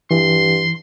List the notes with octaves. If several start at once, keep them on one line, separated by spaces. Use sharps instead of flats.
G2 E3 C6